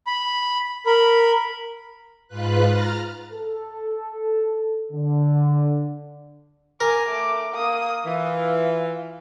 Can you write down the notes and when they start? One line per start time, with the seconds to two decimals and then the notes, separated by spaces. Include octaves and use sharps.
0.07 B5
0.86 A#4 B5
2.28 G#2 F4 B4 F#6
2.65 A#5 F6 A6
3.33 A4
4.92 D3
6.81 A#4 G#5 D6
7.09 A3 D6
7.54 A#3 D#6
8.05 E3 F4